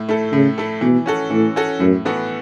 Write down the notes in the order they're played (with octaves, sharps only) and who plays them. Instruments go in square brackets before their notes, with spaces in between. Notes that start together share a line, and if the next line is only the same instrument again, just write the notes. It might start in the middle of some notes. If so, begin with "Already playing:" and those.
Already playing: [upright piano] A2
A3 E4 A4
[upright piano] A2 [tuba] C#3
[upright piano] A3 E4 A4
[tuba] B2 [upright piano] E3
[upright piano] C#4 F#4 A4
[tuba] A2 [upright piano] E3
[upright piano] C#4 F#4 A4
[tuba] F#2 [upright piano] A2
[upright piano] E3 B3 F#4 A4